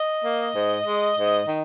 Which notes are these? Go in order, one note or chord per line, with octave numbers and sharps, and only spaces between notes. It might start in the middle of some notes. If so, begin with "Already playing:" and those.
Already playing: D#5
A#3
G#2
G#3
G#2
D#3